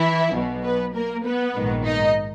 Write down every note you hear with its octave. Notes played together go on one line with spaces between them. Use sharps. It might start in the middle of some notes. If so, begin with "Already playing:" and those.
Already playing: E3 E4
B1 B2
B3 B4
A#3 A#4
B3 B4
A#1 G#2 D#3
D#4 D#5